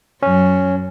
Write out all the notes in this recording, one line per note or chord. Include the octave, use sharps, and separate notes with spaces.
F#2 F#3 C#4